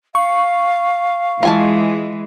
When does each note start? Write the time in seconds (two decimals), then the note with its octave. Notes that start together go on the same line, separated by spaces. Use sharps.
0.15 F5 C#6
1.43 E3 G#3 F4 G#5 A5